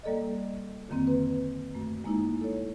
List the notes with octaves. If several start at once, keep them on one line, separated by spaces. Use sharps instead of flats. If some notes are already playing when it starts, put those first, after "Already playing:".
G3 A#3 A4 D5 D#5
F2 D3 D#3 A#3 C4
B4
F#2 A3
G#3 A#3 D#4 E4
A4 C#5